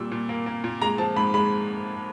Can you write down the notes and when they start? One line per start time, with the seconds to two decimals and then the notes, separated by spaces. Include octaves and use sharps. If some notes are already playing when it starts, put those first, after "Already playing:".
Already playing: A#2 G3 E6
0.12 A#2
0.29 A#3
0.46 A#3
0.64 A#2
0.81 G#3 A#5
0.98 F3 A5
1.16 G#2 B5
1.34 G#3 B5